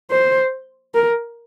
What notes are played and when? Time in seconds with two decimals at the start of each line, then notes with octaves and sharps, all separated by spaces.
0.12 C5
0.95 A#4